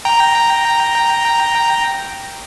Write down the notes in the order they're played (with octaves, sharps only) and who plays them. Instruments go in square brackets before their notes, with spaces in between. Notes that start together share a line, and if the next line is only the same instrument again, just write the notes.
[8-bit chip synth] G5 A#5